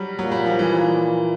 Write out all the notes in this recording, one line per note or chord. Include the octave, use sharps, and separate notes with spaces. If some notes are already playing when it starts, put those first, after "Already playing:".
Already playing: F#3 G3
A#2 F#3
G3
F3
E3